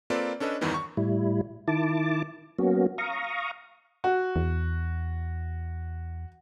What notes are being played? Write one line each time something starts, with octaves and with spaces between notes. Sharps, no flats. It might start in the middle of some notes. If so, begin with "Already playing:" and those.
A#3 C4 F4 A4 B4 D5
C#4 D4 A4 B4 D#5
E2 G2 D#3 E3 B3
C#6
A2 G3 E4
D#3 E4 A5 D6
F#3 A#3 B3 C#4 F#4
F5 A#5 C#6 D#6
F#4
E2